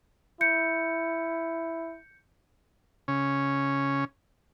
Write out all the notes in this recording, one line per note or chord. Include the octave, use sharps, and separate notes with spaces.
E4 G6 C#7
C#3 C#4